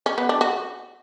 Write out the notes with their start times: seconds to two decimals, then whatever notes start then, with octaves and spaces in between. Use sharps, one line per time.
0.06 C#4
0.18 B3
0.29 D4
0.41 F#4